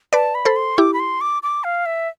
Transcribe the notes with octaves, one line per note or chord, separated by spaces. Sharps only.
B4 D5 A5
B5
A4 C5
C6
E4 G4 D6
B5
C6
D6
D6
F5
E5